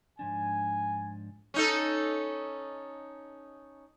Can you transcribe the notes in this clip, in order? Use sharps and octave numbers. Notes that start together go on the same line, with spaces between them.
G#2 F3 D4 G#5
C#4 D#4 A4